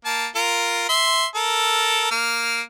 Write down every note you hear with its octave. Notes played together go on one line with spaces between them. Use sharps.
A#3 A5
F4 A#4
E5 C6
A4 A#4
A#3 F6